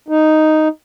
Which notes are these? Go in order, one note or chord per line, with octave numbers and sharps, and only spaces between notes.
D#4